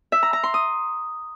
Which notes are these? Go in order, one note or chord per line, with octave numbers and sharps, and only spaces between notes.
E5
A#5
A#5
C6
D#6